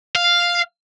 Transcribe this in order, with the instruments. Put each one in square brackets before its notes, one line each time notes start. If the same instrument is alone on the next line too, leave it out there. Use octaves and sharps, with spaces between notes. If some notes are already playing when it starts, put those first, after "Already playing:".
[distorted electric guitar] F5